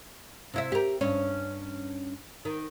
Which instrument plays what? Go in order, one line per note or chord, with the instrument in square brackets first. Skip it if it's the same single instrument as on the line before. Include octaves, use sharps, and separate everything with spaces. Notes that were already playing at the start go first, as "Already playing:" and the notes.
[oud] C3 E4 E5
G4 A#4
G2 C#4
D#3